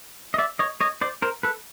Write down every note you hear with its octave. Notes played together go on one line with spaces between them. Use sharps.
D#5
D5 E5
C#5 D#5
C#5 D#5
C5 D5
A#4 C5
A4 B4